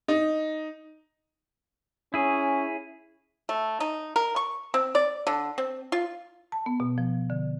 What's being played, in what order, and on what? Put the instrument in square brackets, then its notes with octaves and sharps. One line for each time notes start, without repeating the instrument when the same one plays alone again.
[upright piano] D#4
[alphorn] C#4 [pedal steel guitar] E4 G#4
[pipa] A3
D#4
A#4
C#6
C4
D5
D3
C4
F4
[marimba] A5
B3
B2
F3
D3